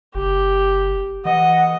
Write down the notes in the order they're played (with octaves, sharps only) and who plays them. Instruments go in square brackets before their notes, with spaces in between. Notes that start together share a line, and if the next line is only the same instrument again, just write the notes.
[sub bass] F#1 [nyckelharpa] G4
[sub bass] E3 [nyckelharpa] D#5 [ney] F#5